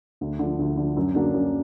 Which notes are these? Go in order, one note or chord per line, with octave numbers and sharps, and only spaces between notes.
D2
D3 F3
D2
D3 F3
F#2
D3 F#3 A#3 D4
F#2